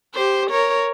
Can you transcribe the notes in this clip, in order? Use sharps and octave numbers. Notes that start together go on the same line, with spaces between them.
G4 C5
A#4 C#5